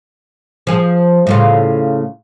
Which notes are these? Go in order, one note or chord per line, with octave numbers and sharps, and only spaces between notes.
F3 G#4
A2 C#3 F4